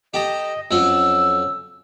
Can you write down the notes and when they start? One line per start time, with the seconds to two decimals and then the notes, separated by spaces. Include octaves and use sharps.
0.14 G4 A4 D#5 A#5
0.71 F2 F#3 C#4 E6